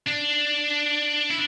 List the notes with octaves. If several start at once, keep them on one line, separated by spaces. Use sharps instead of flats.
D4
E4